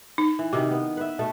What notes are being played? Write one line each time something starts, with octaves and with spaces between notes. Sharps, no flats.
D#4
E3
C3 D#3 F#4
B3
B4 E5
B2 A3